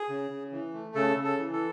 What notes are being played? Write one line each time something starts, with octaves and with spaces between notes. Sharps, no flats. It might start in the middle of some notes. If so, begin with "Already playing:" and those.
Already playing: G#4
C#3
C#3
E3
A3
C#3 A4
C#3
A4
E3
A4